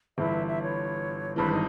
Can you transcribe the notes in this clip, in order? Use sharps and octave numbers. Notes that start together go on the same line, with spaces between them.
G1 G2 E3 E5
E5
C#5
G#1 G2 E3 B4
D#4